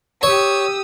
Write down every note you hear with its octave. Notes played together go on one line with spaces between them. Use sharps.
G4 C#5 D#6 E6